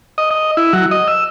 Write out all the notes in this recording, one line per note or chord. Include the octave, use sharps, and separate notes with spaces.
D#5
D#5
E4
F#3
D#5
E6